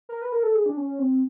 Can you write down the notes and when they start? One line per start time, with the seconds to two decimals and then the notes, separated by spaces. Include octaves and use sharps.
0.09 A#4
0.22 B4
0.32 A#4
0.43 A4
0.54 G#4
0.66 D4
0.77 C#4
0.99 C4